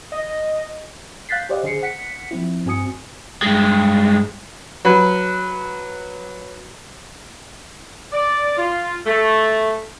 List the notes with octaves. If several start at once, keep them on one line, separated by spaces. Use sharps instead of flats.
D#5
F5 F#6 G6 A6 B6 C7
G4 C5 D5 D#5 F5 F#5
D3 G#4 C5 C7 C#7
F#5 B6 C#7
F3 C4 E4
G2 C4 F#4 G#5 D#6 C#7
G2 G#3
F#3 B4
D5
F4
A3